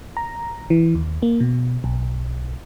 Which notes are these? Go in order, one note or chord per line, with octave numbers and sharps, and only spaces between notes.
A#5
E3
D#2
A#3
B2
B1